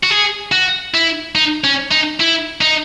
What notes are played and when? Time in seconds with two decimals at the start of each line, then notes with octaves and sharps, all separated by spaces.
0.04 F#4
0.11 G#4
0.52 F#4
0.95 E4
1.35 D#4
1.64 C#4
1.91 D#4
2.20 E4
2.61 D#4